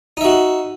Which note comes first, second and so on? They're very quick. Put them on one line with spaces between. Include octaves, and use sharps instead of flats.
D#4 E5 F#4